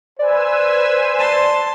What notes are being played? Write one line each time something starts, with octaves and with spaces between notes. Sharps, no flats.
B4 C5 D5 G#5 E6
A5 C6